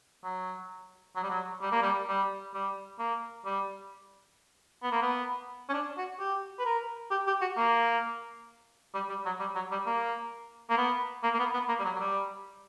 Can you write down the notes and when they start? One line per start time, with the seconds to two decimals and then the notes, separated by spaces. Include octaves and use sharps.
0.24 F#3
1.16 F#3
1.23 G3
1.30 F#3
1.61 G3
1.72 A#3
1.82 G3
2.08 G3
2.54 G3
2.99 A#3
3.45 G3
4.82 B3
4.92 A#3
5.02 B3
5.69 C#4
5.74 D4
5.97 F#4
6.19 G4
6.59 B4
6.65 A#4
7.11 G4
7.27 G4
7.41 F#4
7.57 A#3
8.94 G3
9.09 G3
9.25 F#3
9.40 G3
9.55 F#3
9.71 G3
9.86 A#3
10.70 A#3
10.77 B3
11.23 A#3
11.34 A#3
11.39 B3
11.53 B3
11.68 A#3
11.79 G3
11.84 F#3
11.96 F#3
11.99 G3